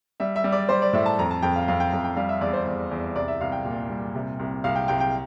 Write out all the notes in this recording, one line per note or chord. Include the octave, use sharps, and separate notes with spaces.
G3 E5
E5
G3
D5
G3 C5
D5
A2 E5
A5
F2 A#5
A5
F2 G5
F5
F2 F5
G5
F2
G5
G3 F5
E5
E2 D5
C5
E2
E2
C2 D5
E5
C2 F5
G5
A#2
G3
C3
C2
C2 F5
G5
C2 G5
G5